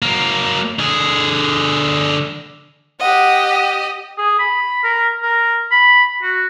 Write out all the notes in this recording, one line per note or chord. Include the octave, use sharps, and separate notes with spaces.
F#3 A#3
D3 G#4
G4 D#5 F#5
G#4
B5
A#4
A#4
B5
F#4